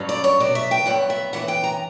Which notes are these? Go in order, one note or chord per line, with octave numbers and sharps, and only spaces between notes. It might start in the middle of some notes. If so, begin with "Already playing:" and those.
Already playing: G2 F#3 C#4
D5
C#5
B2 F#3 B3 D5
E5
G5
G2 F#3 B3 F#5
E5
F#2 E3 B3 F#5
G5
A#5